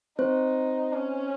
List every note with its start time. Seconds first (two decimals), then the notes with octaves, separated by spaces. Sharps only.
0.19 C4 D#4 C5
0.92 C#4